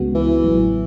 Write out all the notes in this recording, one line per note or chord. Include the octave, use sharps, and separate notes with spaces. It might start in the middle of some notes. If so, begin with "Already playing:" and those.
Already playing: C#2 C#3 G#3 B3 F#4
E3
A1 A2 F#3